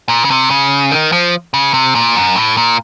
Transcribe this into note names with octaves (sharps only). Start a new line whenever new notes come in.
A#2
C#3
C3
C#3
D#3
F3
C#3
C3
A#2
F#2
A2
A#2